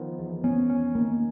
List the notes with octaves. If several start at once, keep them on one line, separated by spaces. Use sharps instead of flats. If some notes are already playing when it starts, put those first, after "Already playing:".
Already playing: D#3 F3 B3
E2
B3 C#4
C#4
D#3 A#3